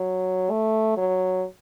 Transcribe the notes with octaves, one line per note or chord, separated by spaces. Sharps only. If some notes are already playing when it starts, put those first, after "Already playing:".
Already playing: F#3
A3
F#3